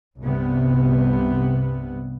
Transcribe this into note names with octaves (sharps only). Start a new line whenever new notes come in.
C2 G2 C3 B3